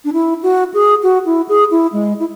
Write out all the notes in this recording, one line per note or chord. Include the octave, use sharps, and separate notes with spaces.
D4
E4
F#4
G#4
F#4
E4
G#4
E4
G#3
E4